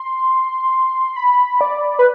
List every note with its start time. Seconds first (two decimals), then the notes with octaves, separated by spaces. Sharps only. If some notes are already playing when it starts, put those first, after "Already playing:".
Already playing: C6
1.16 B5
1.61 D5
1.99 B4